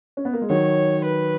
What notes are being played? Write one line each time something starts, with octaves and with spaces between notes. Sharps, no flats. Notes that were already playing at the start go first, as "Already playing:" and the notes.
C#4
B3
A#3
G#3
D#3 F#3 C#5
B4